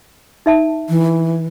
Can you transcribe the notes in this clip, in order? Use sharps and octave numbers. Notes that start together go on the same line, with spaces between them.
D#4 E5 A5
E3